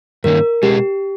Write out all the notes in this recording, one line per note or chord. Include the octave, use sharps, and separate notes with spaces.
G2 D#3 A#3 C#4 A#4
B2 G#3 C#4 G4 G#4